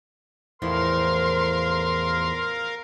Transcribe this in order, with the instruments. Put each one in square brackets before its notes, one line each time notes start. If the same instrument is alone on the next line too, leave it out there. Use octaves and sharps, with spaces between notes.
[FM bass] E2 [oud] A2 F3 E4 [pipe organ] A#4 F5 [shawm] C6